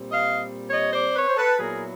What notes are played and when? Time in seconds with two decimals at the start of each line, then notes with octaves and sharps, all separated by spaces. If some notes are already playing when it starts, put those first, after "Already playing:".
Already playing: A#2 G3 C4
0.12 D#5 F5
0.70 C#5 D#5
0.93 C5 D5
1.15 B4 C#5
1.28 C5
1.36 A4 B4
1.59 A#2 F#3 B3 E4 G#4 A#4